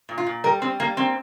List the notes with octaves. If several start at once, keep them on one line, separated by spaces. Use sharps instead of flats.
A#2
F4
A#2
G3 A#4
G3 C4
G3 A#3
A#3 C4